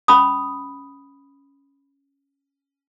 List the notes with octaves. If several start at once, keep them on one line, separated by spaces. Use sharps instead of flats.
C#4 B5 D#6